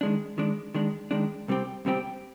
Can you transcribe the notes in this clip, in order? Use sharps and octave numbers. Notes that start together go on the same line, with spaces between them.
D#3 G#3 D4
D#3 G#3 D4
D#3 G#3 D4
D#3 G#3 D4
C2 C3 G3 C4 G4
C2 C3 G3 C4 G4